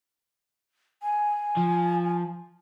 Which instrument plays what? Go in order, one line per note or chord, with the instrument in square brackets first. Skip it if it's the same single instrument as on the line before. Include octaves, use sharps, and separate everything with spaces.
[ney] G#5
[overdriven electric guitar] F3